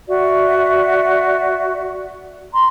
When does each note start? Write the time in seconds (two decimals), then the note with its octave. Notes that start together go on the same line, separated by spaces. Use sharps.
0.09 F#4 D5 E5
2.53 A#5 C6